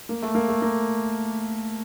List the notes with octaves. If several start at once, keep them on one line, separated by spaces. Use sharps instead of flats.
A#3
A3
A#3
A3
A#3